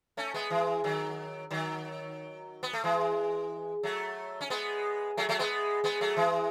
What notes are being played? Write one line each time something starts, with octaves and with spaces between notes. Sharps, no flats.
A3 C#4
G#3 B3
E3 G#3
D#3 F#3
D#3 F#3
B3
A3
E3 G#3
F#3 A3
C#4
G#3 B3
F#3 A3
F#3 A3
G#3 B3
G#3 B3
F#3 A3
E3 G#3